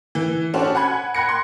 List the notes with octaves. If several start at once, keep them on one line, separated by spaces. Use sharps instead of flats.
E3
C#4 D4 F#4 G4 A4 C5
F#5 G#5 B5 G#6
G5 B5 F#6 G#6 A#6 C#7
C6